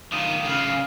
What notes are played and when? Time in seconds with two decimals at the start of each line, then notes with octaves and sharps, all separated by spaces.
0.12 D#3 D4 F4 D#6
0.45 C#3 F5